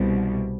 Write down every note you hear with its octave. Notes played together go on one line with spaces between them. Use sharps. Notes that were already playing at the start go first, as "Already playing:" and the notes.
Already playing: C2 B2 G3